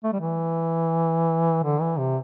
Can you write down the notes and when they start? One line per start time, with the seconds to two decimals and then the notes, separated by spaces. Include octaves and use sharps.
0.04 A3
0.13 G3
0.20 E3
1.63 D3
1.81 E3
1.99 C3